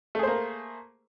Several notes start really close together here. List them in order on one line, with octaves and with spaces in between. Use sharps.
A3 G#4 C5 A#3